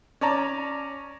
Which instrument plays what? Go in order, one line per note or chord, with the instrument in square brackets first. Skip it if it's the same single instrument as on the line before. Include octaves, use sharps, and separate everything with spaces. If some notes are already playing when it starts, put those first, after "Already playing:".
[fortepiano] C#4 D5 A5 A#5